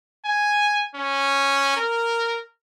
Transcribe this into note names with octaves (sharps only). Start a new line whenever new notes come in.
G#5
C#4
A#4